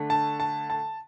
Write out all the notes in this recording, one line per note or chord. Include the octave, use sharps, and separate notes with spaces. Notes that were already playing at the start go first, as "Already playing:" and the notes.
Already playing: D3 A3 D4
A5
A5
A5